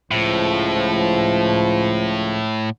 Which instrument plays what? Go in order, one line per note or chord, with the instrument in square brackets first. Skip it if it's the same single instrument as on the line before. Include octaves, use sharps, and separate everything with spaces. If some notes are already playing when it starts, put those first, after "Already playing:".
[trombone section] C#2 F3 [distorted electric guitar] A2